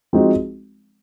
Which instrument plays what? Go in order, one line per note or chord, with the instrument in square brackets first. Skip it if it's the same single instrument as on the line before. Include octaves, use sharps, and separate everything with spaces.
[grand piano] F3 G#3 C4 D#4 F#4